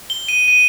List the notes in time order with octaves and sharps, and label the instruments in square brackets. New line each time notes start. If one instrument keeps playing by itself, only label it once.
[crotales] G7
D#7
D#7